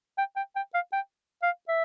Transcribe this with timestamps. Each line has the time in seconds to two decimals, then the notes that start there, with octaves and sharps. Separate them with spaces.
0.18 G5
0.36 G5
0.56 G5
0.74 F5
0.93 G5
1.42 F5
1.69 E5